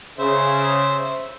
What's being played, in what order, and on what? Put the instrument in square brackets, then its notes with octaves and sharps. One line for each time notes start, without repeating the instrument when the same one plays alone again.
[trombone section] C#3 [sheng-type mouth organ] C5 E5